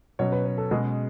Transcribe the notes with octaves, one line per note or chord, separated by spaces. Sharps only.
B2 F#3 C#4 C#5
B4
B4
A4
B2 G#3 C#4 G#4